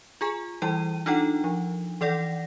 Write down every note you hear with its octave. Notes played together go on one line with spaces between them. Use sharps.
F4 G#4 G#5
E3 G3 E4 G5 D#7
D4 D#4 F4 A4 F#5 G5
F3
E3 A4 D5 F#5 A#6